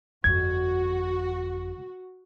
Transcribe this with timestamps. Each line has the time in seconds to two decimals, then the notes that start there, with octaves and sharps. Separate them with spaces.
0.24 G1 F2 F#4 G#6